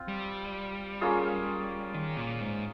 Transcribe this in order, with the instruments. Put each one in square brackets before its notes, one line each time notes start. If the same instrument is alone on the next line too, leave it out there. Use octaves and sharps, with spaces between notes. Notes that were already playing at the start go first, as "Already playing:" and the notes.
Already playing: [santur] C4 F4
[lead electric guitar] G3
[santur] A#3 C#4 F4 G#4
[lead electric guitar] D#3
A#2
G#2